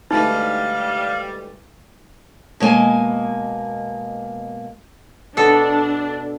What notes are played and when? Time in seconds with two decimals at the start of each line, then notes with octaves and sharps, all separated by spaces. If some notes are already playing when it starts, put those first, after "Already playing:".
0.11 D2 E3 G3 G#3 D#4 F5
2.60 B2 G#3 A#3 G#5
5.37 B2 D4 A4